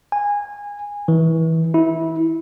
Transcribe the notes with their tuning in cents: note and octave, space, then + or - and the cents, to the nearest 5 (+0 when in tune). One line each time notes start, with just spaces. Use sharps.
G#5 -20
E3 -25
E4 -20